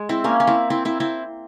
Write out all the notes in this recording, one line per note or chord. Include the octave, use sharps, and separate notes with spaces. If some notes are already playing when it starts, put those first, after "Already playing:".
Already playing: G#3
C4 E4
A#3 C#4
C#4
C4 E4
C4 E4
C4 E4
C4 E4